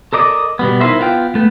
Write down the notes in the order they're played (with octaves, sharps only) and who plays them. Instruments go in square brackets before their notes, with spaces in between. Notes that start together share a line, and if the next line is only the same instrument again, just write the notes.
[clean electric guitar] A4 A#4 D5 D#5
B2 G3 B3
D#4 E4 A4 A#4 C5 E5
B3 F4 G5
A3 B3